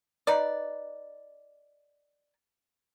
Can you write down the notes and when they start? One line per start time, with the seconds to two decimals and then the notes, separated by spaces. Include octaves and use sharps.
0.27 D#4 B4 D5